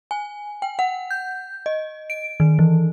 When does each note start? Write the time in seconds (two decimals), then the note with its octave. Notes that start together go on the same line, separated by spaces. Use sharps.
0.11 G#5
0.62 G5
0.79 F#5
1.11 G6
1.66 D#5
2.10 D7
2.40 D#3
2.59 E3